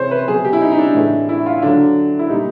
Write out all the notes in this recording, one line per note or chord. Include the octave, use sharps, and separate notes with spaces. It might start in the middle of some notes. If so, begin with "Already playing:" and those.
Already playing: C3 E3 G#3 C5 C#5
B4
B2 F#3 G#4
G4
E4
D#4
D#4
D4
A2 E3 G#3
E4
F4
D3 F#3 D4
E4
A#2 G3 D#4